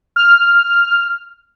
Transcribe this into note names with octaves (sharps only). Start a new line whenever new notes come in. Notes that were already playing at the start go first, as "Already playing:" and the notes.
F6